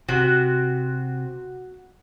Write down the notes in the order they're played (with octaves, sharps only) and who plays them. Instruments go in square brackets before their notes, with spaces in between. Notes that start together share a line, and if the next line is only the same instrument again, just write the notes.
[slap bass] C3 [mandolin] F#4